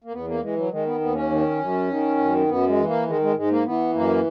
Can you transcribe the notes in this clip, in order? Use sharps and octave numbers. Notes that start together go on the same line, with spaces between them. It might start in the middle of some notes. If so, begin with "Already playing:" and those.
A#3
E2 B3
A#3
E3 G#3
F#3
D#3 G#3
B3
D#2 B3
C#4
D#3
F#2
D#3
F#2
F#2 B3
G#3
E3
A#3
D#3 G#3
G#3
G#2 G#3
A#3
E3 B3
F#2 A#3